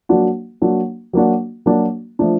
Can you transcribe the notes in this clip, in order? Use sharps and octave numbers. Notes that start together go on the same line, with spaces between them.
F#3 A#3 D4 F#4
F#3 A#3 D4 F#4
F#3 A#3 D4 F#4
F#3 A#3 D4 F#4
F3 A3 D4